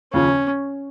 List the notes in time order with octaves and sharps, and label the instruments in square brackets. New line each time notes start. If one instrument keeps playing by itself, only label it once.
[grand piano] D#2 C#3 F3 [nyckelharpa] C#4